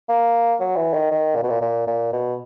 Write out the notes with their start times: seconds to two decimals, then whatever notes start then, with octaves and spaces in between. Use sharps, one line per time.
0.09 A#3
0.60 F#3
0.76 E3
0.93 D#3
1.11 D#3
1.35 A#2
1.43 B2
1.50 A#2
1.61 A#2
1.87 A#2
2.13 B2